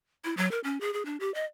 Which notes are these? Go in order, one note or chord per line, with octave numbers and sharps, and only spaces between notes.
E4
F#3
A#4
C#4
G#4
G#4
D4
G4
D#5